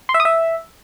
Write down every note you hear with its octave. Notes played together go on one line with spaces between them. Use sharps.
C6
E5
D#6
E5